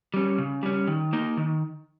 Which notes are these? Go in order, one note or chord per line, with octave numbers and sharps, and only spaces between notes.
G3 C#4
C#3
G3 C#4
D#3
A#3 D#4 A#4
D#3